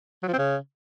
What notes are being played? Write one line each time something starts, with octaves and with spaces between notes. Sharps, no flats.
F#3
F3
C4
C#3